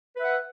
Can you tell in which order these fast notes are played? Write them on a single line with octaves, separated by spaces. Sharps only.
B4 E5 F#5